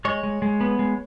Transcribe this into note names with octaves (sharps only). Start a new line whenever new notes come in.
G#3 C#5
G#3
G#3
B3
G#3